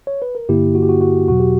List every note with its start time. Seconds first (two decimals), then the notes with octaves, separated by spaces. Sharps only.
0.07 C#5
0.22 B4
0.35 A#4
0.49 G2 D3 A#3 E4 G4
0.75 F#4
0.82 G4
0.89 F#4
1.01 F#4
1.28 E2 B2 F#3 F#4
1.40 G4